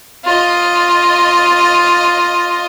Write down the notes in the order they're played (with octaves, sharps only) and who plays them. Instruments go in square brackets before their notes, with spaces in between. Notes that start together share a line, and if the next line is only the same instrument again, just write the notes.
[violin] F4 D#5